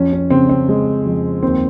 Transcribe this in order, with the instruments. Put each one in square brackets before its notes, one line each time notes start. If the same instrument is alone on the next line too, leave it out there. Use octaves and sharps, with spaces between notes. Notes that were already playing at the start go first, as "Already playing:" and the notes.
Already playing: [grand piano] F2 C#4
C#4
C#3 C4
C4
G#3
F2
D#2 C4